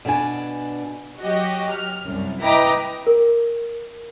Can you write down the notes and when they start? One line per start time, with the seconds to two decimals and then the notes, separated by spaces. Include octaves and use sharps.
0.05 B2 B3 D4 G#5
1.20 F#3 F#4 G4 D#5
1.71 F6
2.04 C2 F#2
2.41 E4 B4 D#5 G5 A#5 D6
3.07 A#4